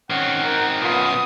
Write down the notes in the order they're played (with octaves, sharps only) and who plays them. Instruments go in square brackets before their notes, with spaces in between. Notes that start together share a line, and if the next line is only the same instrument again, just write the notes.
[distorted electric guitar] D#3 C4 [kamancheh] C#4 [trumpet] F#5
[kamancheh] A#4 G5
[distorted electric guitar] F#2 B2 [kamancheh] B3 D#6 [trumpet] F4